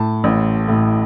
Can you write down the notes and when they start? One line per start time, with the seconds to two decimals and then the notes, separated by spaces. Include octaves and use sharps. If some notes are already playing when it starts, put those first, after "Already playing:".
Already playing: A2 A5
0.24 A1
0.68 A2